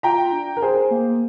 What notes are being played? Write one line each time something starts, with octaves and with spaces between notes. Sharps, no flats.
F4 G5 A#5
D4
A#4
G#4 C5
A#3